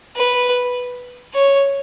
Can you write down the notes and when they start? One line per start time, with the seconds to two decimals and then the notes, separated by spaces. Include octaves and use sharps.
0.16 B4
1.34 C#5